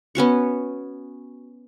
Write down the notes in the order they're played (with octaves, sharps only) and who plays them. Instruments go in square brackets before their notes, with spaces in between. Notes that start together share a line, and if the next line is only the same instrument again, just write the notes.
[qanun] B3 C#4 F#4 C#6